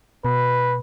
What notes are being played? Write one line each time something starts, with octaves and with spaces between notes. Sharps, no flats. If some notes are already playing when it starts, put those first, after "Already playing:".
B2 B4